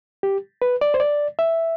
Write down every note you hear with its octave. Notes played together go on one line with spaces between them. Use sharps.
G4
B4
D5
C5
D5
E5